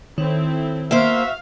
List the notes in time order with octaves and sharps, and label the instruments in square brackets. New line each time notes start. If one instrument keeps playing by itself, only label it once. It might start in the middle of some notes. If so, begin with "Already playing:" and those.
[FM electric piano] D#3 C#5 [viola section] C4 E4 A4
[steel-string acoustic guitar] A#3 C5 [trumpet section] F#4 E5 [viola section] F5